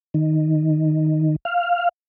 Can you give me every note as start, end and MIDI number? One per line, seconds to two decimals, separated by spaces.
0.14 1.36 51
1.45 1.89 77